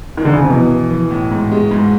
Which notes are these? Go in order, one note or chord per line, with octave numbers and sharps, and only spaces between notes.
D#3
D3
C#3
C3
B2 E3
E3
E3
A2
G#2
G#3
G#2